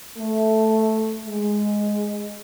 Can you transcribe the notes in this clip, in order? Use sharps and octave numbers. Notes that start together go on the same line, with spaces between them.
A3
G#3